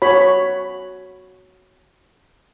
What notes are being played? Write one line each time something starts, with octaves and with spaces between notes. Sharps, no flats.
F#4 C#5 B5